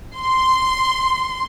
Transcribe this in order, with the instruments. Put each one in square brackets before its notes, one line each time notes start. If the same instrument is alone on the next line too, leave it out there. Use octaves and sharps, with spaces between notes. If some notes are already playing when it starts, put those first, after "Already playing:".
[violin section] C6